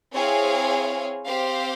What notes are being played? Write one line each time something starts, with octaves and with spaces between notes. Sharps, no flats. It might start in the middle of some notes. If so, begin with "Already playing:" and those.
C4 E4 G#4 C#5 F5
C4 G4 C5 F5